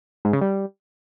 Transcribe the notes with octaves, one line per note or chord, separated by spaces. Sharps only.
G#2
C#3
G3